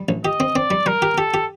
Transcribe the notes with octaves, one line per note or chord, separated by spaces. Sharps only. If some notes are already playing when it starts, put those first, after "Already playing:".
Already playing: G3
A1
G4 D#5
C4
C4 D5
G3
G3 A#4
G4
G4 A4
G4